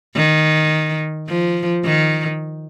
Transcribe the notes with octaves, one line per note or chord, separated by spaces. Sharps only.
D#3
F3
D#3